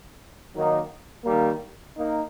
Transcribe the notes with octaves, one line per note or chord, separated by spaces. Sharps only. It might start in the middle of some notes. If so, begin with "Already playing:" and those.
D#3 F#3 A#3 D#4
D#3 G3 A#3
A#3 D#4